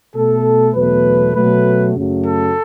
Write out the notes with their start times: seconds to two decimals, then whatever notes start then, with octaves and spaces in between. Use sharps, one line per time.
0.15 B2 A3 A4
0.74 E2 B2 F#3 A3 B4
1.34 B2 F#3 A3 B4
1.95 F#2 C#3 F#3 A3
2.24 A4